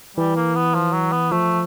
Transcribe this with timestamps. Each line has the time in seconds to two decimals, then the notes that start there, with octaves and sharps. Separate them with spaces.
0.17 E3 G3
0.36 A#3
0.55 B3
0.74 F3
0.93 F#3
1.12 B3
1.31 F3 A3